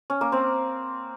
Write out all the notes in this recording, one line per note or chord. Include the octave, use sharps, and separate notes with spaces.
C#4
A#3
C4